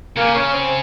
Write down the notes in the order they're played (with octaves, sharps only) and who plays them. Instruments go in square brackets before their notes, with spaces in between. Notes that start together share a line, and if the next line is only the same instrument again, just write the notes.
[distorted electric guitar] C#3 [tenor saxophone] A#3
[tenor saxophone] C#4
C4